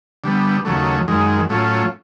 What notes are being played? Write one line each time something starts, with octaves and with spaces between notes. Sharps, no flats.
D3 G3 B3
D#2 C#3 F#3 A3
F#2 D#3 G#3
A2 F#3 A3 C#4 F4